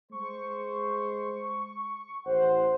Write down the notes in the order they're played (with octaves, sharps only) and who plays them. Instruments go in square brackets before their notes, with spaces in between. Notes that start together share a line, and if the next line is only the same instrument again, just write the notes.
[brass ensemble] G#3 C5 [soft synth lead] C#6
[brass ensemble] A1 F#5 [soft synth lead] C5